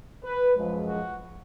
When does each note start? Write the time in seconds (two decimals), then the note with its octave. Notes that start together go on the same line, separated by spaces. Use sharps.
0.24 B4
0.56 F#2 F3 G#3
0.87 F#4